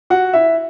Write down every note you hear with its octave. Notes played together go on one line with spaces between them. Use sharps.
F#4 F#5
E4 E5